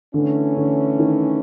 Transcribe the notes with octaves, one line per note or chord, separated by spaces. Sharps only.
D3 E3 A3 C#4
D3
D#3